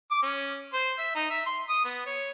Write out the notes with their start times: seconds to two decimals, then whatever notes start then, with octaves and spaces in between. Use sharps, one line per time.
0.11 D6
0.23 C#4
0.73 C5
0.98 E5
1.15 D#4
1.30 E5
1.46 C6
1.69 D#6
1.85 B3
2.06 C#5